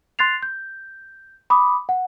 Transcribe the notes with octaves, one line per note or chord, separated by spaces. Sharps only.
C6 F#6 A6 C7 F7
G6
B5 D6 D#6
F#5